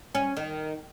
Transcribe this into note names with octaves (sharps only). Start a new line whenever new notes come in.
C#4
D#3